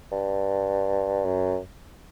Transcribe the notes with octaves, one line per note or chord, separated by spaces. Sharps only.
G2
F#2